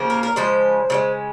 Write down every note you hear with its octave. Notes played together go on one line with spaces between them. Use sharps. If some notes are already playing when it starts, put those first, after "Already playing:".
Already playing: C#3 F3 A#3
A#4
A#4
C#3 F3 G#3 C5
C#3 F3 G#3